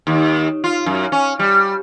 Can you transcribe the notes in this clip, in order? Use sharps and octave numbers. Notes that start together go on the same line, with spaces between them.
D#2
F4
F#2
C#4
G3